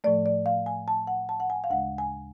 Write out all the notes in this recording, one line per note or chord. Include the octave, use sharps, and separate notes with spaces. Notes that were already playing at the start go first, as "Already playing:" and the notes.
A2 F3 A3 D5
D5
F5
G#5
A5
F#5
A5
F#5
G#5
F5
D2 C#3 G#3 F#5
G#5